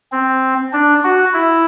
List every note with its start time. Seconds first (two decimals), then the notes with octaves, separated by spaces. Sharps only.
0.12 C4
0.73 D4
1.04 F#4
1.34 E4